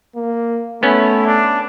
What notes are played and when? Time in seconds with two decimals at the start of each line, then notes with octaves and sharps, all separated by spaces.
0.15 A#3
0.83 A3 B3 C#4 E4
1.26 D4